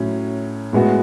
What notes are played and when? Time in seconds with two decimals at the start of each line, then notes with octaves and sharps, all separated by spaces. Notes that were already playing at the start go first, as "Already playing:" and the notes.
Already playing: A2 F#3 C#4
0.73 A2 G#3 B3 F#4